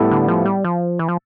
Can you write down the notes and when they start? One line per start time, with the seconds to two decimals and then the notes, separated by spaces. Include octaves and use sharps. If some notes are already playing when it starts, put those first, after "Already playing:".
Already playing: A2 G3 B3 E4 A4
0.11 D3
0.28 F3
0.45 G3
0.64 F3
0.99 E3
1.09 F3